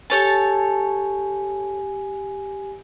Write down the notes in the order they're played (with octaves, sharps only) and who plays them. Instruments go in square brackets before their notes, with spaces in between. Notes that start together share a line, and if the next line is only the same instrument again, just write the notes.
[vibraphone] G4 G#5 [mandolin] A4 C#5 A5